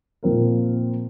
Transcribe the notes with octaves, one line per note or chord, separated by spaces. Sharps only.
A#2 F3 C4 F4 A#4